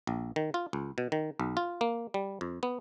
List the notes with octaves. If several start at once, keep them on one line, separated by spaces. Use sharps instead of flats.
A#1
D#3
F4
C#2
B2
D#3
B1
F4
A#3
G3
F2
B3